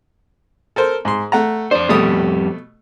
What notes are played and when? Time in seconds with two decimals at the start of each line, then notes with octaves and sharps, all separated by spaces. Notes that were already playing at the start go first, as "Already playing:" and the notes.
0.76 A4 A#4 C5
1.05 G#2 C6
1.32 A3 F#5 A#5
1.71 F2 D4 C5
1.89 F2 B2 G3 A3 D#6